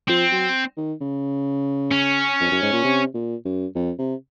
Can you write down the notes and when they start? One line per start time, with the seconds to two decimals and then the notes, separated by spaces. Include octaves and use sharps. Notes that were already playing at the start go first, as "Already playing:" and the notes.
0.09 F3 C4
0.32 F#3
0.77 D#3
1.01 C#3
1.92 C#4
2.40 F2
2.51 F#2
2.62 G#2
2.73 A#2
2.84 C3
3.14 A#2
3.45 F#2
3.75 F2
3.98 C3